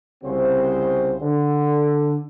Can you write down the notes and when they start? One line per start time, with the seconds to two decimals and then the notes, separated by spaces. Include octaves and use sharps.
0.24 C2 C#3 C4 F#4 C5
1.21 D3